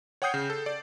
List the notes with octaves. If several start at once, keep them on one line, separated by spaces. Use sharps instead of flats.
C#5 F#5 G5 D#6 G6 C7
C#3
A4
D5